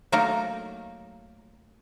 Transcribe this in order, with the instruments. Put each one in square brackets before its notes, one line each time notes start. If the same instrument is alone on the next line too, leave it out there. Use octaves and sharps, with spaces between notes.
[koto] F#3 A3 A#3 D#4 A#4